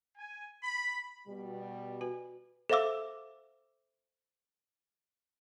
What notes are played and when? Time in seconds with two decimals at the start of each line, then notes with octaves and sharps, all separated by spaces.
0.18 G#5
0.63 B5
1.27 B2 G3
2.01 F#4 B4 G#5
2.70 A4 C5 E5 F5 D6 E6